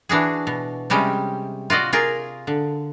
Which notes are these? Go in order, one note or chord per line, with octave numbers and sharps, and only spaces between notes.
E3 D4 F#4 G#4
B2
C3 G3 G#3 C#4 G5
F4 F#4 D5 D#5
F4 G#4 A#4
D3